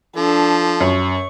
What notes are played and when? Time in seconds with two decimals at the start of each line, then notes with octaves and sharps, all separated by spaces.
0.17 F3 D4 A4
0.80 F#2 C#6